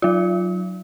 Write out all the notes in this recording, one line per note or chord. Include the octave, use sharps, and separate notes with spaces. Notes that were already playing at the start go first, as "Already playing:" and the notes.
F#3 F4